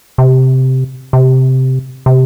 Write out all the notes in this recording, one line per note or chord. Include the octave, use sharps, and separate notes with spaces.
C3
C3
C3